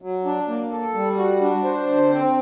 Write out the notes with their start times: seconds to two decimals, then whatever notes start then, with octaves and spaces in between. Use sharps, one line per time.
0.02 F#3
0.25 D4
0.48 A#3
0.71 A4
0.94 G3
1.17 F#4
1.41 D4
1.64 C5
1.87 D3
2.10 C4